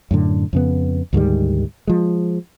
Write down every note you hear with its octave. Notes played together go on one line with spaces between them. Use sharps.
F#2 A2 D3
F2 C#3 B3
D2 G#2 D#3 G3
F3 G#3